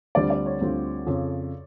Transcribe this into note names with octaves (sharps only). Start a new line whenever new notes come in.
D2 D3 G3 C4 F4 D5
D5
C#5
D2 D3 G3 C4 F4
F2 C#3 F3